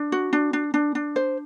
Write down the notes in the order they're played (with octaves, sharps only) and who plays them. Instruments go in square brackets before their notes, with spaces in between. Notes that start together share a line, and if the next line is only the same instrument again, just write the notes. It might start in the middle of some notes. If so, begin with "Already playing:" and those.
Already playing: [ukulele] D4
F#4
D4
D4
D4
D4
C5